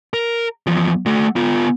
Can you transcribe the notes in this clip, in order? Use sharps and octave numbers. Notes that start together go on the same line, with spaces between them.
A#4
E2 F3
A3 F#4
B3 F4